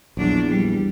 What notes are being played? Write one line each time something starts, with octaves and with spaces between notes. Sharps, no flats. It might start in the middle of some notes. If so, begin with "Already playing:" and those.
A#1 E2 F#3 D4
G3